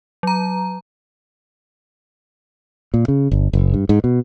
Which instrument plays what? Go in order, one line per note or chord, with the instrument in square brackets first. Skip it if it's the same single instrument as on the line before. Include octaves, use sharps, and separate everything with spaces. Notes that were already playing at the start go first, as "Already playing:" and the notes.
[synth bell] F#3 A#5
[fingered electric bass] A#2
C#3
G1
F#1
G2
G#2
B2